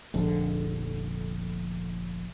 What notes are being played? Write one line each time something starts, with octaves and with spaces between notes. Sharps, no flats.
F1 A#1 F2 D3